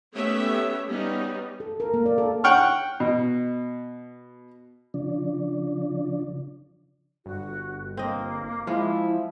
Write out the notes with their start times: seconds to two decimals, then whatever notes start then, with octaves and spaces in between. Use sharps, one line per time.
0.13 A3 B3 C#4 G4 C#5 E5
0.87 G3 B3 C#4 D#4
1.60 A4
1.80 A#4
1.94 A#3
2.06 D5
2.18 A4
2.44 F#5 G5 C#6 F6
3.00 B2
4.94 C#3 F3 D4
7.26 G1 F#4
7.97 A#3 C4 D#5
8.67 F3 G#3 E4 F4